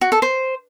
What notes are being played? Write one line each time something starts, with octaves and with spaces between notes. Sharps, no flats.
F#4
A4
C5